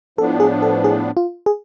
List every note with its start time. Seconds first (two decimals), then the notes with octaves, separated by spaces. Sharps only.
0.18 A2 F3 B3 D4 A4
0.40 G#4
0.62 A4
0.84 G#4
1.17 F4
1.46 G#4